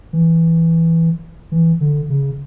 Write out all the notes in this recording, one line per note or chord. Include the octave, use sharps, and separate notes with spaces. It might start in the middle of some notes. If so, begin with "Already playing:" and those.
E3
E3
D3
C#3